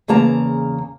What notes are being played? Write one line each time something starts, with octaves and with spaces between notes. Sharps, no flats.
E2 C#3 A#3 A5 A#5